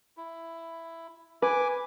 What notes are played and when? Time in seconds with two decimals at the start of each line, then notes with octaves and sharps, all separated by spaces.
0.17 E4
1.42 B4 G#5 D6